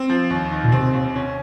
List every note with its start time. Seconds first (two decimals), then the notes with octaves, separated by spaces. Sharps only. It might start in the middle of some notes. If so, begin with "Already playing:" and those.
Already playing: C4
0.10 F3
0.30 D#2
0.51 D#3
0.64 A#2
0.72 C3 C4
0.94 D#2
1.16 C#4